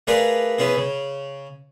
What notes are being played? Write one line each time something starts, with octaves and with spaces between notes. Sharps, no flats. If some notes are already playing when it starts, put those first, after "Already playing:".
A3 G#4 A#4 B4 D5 F5
B3 C#4 E4 G#4
C#3